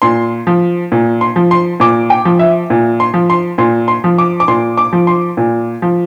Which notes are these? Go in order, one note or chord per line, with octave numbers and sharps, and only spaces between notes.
A#2 C6
F3
A#2
C6
F3
C6
A#2 D6
G5
F3
E5
A#2
C6
F3
C6
A#2 C6
C6
F3
D6
D6
A#2 C6
D6
F3
C6
A#2
F3